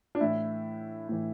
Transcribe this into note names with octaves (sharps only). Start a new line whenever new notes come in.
D4
A2 E3 E4
A2 E3